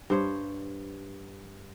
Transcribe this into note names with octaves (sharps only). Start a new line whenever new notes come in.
G2 C5 C#5